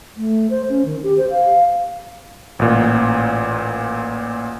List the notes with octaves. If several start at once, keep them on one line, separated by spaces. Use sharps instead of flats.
A3
C5
C#4
D#3
G4
C5
F5
A1 A#2